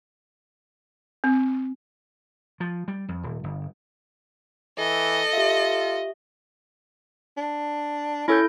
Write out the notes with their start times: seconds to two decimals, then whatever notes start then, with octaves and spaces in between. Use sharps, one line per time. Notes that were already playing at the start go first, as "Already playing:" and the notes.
1.24 C4
2.60 F3
2.88 G3
3.09 F2
3.23 D#1
3.44 G1
4.78 E3 A4 D#5
5.33 F4 G4 E5
7.37 D4
8.28 C#4 E4 A4 G6